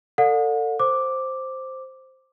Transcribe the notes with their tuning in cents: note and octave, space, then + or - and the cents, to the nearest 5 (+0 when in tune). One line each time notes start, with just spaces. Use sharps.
A4 +30 D5 +0 F#5 -40
C5 +0 D6 +0